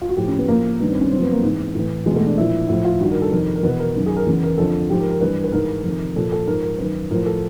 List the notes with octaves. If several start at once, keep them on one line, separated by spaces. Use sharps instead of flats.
F4
F#4
A2 F3 G4
C#4
B3
A2 F3 A#3
G2 D#3 B3
C4
C#4
F#2 C#3 F3 C4
B3
A#3
G#2 E3
A2 E3
E2 B2 G#3
A3
D4
A#2 F3 E4
A2 F3 E4
F4
G2 D#3 F#4
A#4
A4
F2 C3 D#3 A#4
A#4
E2 B2 B4
A#4
F#2 D#3
G#4
A#4
E2 C#3 E3
A#4
F2 D3 F3 A4
G#2 F3 G4
A#4
A#4
G2 E3 B4
B4
G#2 E3 A#4
F2 C3 D#3
A#2 F3 A4
A4
G#2 F3 A#4
A#4
F#2 D#3 B4
A2 F3 A#4
A4